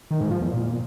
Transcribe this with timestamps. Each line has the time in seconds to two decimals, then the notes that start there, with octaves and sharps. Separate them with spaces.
0.11 D#3
0.21 G#2
0.31 F3
0.41 E2
0.51 A#2